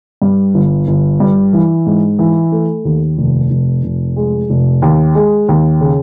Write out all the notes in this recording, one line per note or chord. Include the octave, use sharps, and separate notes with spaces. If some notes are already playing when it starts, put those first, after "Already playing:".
G2
G1
G1
G2
E3
G#2
E3
A3
D#2
F1
F1
F1
G#3
F1
D#2
G#3
D#2
C#3